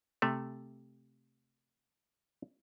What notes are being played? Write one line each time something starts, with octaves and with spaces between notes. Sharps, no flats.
C3 A3